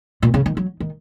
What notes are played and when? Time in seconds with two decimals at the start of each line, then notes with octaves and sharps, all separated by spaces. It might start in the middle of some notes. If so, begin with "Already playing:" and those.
0.22 A#2
0.34 C#3
0.46 D#3
0.57 F#3
0.80 D#3